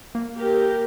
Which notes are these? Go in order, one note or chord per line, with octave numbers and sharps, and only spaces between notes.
A#3
G4 A#4